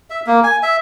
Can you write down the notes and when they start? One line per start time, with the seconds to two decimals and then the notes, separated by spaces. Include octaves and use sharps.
0.10 E5
0.27 A#3
0.44 G#5
0.63 E5